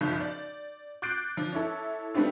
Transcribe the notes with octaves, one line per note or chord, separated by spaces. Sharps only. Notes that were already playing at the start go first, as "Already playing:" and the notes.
F#1 B1 C#3 F3 G6
D5
D6 F#6 G6 A6 C7 D7
F3
C#4 E4 A4
G3 A3 B3 C4 D4 F4